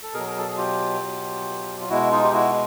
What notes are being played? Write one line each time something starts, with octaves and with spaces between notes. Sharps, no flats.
A4
B2 F#3 G#4 A#4
A#4
A4
G#4
F4 G4
B2 F#3
F4
B2 G#3 E4 F#4
D#4 F4
G4
E4 F#4